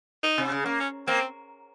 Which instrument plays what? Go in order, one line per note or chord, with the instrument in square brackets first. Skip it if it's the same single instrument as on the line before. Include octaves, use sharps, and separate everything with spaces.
[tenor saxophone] D#4
[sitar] C3
C#3
A#3
[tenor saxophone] C#4
[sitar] A#3 [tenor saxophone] C4